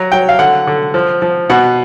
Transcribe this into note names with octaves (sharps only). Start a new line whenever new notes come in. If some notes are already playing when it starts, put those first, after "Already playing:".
Already playing: F#3 A#5
F#3 G5
F5
D3 F#5
D3
F3
F3
B2 F#5